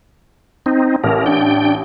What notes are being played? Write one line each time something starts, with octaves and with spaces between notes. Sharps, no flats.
C4 D#4
A1 A#4
D4 G5